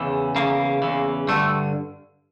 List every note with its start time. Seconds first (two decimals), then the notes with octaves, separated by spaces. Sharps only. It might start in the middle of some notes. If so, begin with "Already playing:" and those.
Already playing: E2 C#3 E3
0.35 E2 C#3 E3 A#3
0.82 E2 C#3 E3
1.28 G2 D3 A3